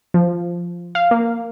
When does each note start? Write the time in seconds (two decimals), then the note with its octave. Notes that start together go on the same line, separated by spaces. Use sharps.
0.14 F3
0.95 F5
1.11 A#3